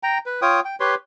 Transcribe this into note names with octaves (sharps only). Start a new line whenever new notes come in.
G5 A#5
B4
F4 C#5 G5 D#6
G5
G4 B4 C#5 C6